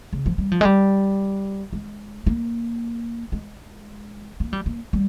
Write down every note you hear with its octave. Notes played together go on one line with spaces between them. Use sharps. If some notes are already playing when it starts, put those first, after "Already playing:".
C#3
F3
G3
F3
G#3
G3
G#3
A#3
G#3
A#3
G3
A#3
G3